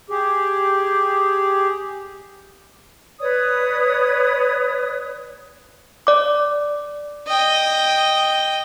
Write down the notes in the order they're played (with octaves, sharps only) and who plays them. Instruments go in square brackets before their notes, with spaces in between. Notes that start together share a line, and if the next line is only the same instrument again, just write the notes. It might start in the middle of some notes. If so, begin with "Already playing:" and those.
[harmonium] G4 G#4
[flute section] B4 C#5 D5 D#6
[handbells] D5 D6
[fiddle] D#5 G5